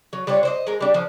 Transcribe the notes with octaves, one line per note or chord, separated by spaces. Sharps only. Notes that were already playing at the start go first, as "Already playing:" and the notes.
F#3
G3 D4 F4 C#5
C5 D5 D#5
G#3 A#4
G3 D4
F3